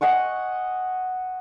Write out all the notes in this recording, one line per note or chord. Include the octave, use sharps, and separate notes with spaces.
D#5 F#5 G#5 C#6